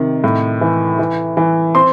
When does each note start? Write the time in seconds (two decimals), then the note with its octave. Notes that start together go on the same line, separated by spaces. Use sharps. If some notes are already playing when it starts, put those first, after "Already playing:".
Already playing: C3 D#3
0.24 A2
0.61 E3
0.99 E3
1.37 E3
1.75 C4 C6